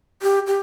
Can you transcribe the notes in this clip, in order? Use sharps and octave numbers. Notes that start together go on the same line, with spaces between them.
G4
G4